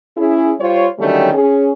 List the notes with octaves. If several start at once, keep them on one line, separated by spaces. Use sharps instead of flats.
C#4 E4 G#4
G3 F4 C5 C#5
D3 D#3 F#3 G3 A3 C#4
C#4 G#4